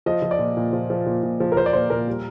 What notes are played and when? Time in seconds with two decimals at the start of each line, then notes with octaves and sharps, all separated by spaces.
0.06 F3 D#5
0.22 F3
0.31 D5
0.39 A#2
0.57 A#2
0.73 F3
0.90 F3
1.06 A#2
1.23 A#2
1.40 F3
1.52 A#4
1.57 F3 C5
1.66 D5
1.73 A#2 C5
1.90 A#2 A#4
2.07 G3